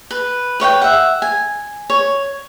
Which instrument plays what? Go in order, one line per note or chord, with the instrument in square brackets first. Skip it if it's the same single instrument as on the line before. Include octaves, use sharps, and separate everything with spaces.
[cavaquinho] B4
B4 C#5 F#5 G5
E5 F#5
G#5
C#5